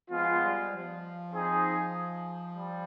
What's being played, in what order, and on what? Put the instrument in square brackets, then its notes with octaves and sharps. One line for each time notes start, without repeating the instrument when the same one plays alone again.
[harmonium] F3 [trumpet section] G#3 B3 F4
[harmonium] G3
F3
[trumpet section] C4 D#4 G#4
G3